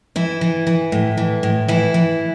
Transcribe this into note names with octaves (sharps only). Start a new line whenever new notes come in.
E3 E4
E3
E3
A2
E3
A2
E3 E4
E3